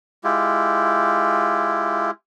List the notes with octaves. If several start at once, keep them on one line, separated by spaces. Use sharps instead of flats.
G#3 E4 F4 G4